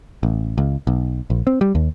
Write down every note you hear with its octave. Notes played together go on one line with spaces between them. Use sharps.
A1
C#2
B1
A#1
C4
G3
D#2